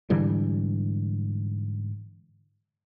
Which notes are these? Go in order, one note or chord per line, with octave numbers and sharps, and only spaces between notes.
G#2 D3 E3 G3